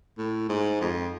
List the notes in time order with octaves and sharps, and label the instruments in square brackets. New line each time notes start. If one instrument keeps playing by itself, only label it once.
[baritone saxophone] A2
G#2
F2